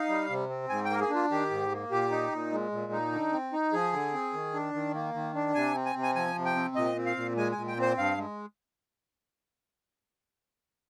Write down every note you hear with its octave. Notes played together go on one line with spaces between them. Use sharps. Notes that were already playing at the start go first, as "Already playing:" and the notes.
Already playing: D#4 F5
G3
C3
C4
G#2 G#5
G5
A#3 A#4
G#4
D4
F4
D#3 G4
G#2
A#3
A#2 G4
D#4
A#2
G#3
A#2
D#4
D3
C4
D#4
F3 G#4
D3
C4
D#3
D4
D#3
A#3
D#3
D4
C3 G#5
C4
G#5
C3
G#5
F3 G#5
C3
G5
C4
A#2 D#5
C4
F5
A#2
G#3 G#5
A#2 G#5
G5
C4 C5
G2 F5
G#3